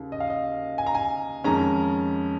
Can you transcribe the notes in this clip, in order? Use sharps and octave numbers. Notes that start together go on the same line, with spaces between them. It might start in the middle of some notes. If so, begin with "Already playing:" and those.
Already playing: D#2 C#3 A#3
D#5
F5
D#5
G#5
A#5
G#5
F2 D#3 G#3 C#4 A#5